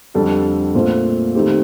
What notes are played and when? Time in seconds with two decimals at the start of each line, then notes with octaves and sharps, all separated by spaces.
0.14 F2 D3 G3 D4 A4
0.74 A#2 A3 C4 F4 C5
1.35 D#3 A3 C4 G4